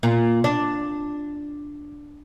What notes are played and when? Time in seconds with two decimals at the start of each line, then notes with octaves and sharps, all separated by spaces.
0.03 A#2
0.44 D4